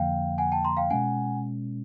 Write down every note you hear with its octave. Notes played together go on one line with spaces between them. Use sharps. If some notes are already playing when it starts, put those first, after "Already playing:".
Already playing: F2 D3 F3 A#3 F5 G5
F#5 G#5
G5 A5
A#5 C6
F5 G5
B2 G#3 C#4 F#5 G#5